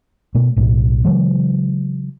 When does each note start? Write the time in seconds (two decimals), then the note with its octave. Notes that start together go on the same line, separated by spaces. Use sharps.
0.35 B2 A3
0.57 B1 A2
1.05 C#3 E3 F#3 G#3